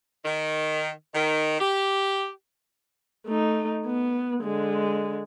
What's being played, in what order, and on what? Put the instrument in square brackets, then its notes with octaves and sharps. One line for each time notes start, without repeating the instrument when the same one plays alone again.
[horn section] D#3
D#3
G4
[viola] A3 D#4
B3
D3 G#3